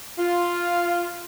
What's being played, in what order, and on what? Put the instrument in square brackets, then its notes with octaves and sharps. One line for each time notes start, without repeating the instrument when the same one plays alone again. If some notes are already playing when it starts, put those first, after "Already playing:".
[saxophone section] F4